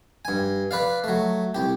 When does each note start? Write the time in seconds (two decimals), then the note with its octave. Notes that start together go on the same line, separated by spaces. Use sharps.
0.25 G2 G#5
0.71 B4 D5 F5
1.04 F#3 A3
1.55 C2 G4